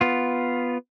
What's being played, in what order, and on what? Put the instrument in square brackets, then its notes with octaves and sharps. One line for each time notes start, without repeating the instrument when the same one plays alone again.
[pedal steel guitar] B3 F4